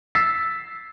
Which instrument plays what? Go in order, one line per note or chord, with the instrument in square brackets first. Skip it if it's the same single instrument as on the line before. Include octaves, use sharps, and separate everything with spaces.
[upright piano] E6 A6 B6 C7